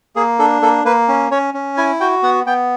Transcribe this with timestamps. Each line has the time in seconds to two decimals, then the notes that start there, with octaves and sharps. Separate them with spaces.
0.16 A#3 G#4
0.39 D4 A4
0.62 A#3 A4
0.85 A#3 B4
1.08 C#4
1.31 C#4 C#5
1.54 C#4
1.77 E4 G#5
2.00 F#4 G5
2.23 B3 F#5
2.46 B3 G5